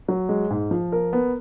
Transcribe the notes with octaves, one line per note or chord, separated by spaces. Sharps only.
F#3
G#3
G#2
F3
A#4
B3